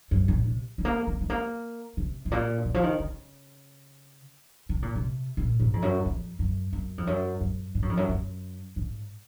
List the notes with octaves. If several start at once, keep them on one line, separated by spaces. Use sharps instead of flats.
F#2
A#2
C3
G#3
A#3
G#3
G#3
A#3
C3
G#2
A#2
D#3
F3
D#3
C#3
C3
A#2
C3
A#2
G#2
F2
F#2
F2
F#2
F#2
F2
F#2
F#2
G#2
F#2
F2
F#2
F#2
G#2